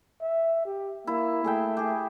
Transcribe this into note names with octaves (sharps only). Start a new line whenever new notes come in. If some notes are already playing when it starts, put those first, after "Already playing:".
E5
G4
A#3 E4
A3 G#4 E5 G5
G4 G#4